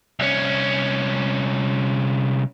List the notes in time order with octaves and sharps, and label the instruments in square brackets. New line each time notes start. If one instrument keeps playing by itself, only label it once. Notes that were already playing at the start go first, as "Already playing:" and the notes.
[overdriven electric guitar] C2 C#4